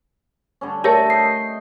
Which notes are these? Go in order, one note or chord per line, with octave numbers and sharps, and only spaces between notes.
D3 G3 C#4
A3 G4 A#4 C#5 A5 E6 A#6
D#5 G5 C7